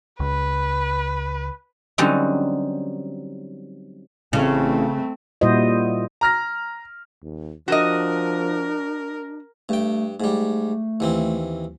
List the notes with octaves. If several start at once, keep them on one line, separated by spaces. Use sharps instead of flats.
C#2 B4
D3 F#3 G3 C4 C#4 D#4
A1 C#3 A3 C4
A#2 G3 E4 F#4 C5 D#5
A#5 F6 A#6
D#2
F3 D4 F#4 A#4 D#5
G2 A3 G5
G#2 G3 A3
D#2 E3 C4